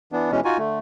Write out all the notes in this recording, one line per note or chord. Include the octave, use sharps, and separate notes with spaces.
E3 B3 D4
B2 E3 G#3 C#4
D#4 F4 F#4 G#5
D3 A3